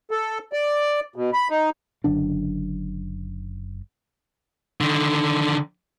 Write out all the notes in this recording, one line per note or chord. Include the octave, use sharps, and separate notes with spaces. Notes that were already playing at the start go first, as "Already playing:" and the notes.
A4
D5
B2
B5
D#4
F#1 F#2 D3 D4
D3 D#3